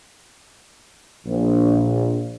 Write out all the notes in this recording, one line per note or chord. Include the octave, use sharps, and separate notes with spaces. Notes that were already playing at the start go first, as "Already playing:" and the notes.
A#1